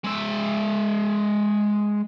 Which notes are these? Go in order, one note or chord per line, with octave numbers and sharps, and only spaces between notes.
G#3 E5